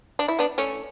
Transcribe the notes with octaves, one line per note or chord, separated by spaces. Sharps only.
D4
E4
B3 D4
A3 C#4